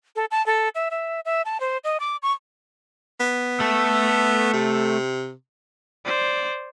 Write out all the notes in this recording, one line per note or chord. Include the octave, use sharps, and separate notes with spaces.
A4
A5
A4
E5
E5
E5
A5
C5
D#5
D6
C#6
B3
A3 A4
C3
C5 D5